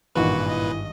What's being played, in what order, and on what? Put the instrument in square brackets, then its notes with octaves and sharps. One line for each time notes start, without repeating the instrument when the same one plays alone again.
[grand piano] G#1 G2 [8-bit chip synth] A#2 B4 [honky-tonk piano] D#3 E3 D#4 [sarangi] F#4
[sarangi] D#5